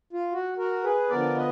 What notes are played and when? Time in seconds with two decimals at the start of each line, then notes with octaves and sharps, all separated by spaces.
0.13 F4
0.33 F#4
0.58 F#4 A#4
0.84 G#4 B4
1.10 D3 F3 B3 A#4 D5
1.36 B4 D#5